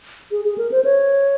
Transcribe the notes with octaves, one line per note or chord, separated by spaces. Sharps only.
G#4
G#4
A#4
C5
C#5